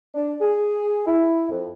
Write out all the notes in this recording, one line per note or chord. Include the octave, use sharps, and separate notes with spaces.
D4
G#4
E4
F2